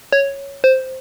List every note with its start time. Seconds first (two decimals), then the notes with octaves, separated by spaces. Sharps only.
0.12 C#5
0.64 C5